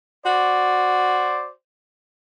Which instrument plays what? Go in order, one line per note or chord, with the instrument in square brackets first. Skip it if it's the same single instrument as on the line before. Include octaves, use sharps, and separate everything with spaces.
[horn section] F#4 C5 D5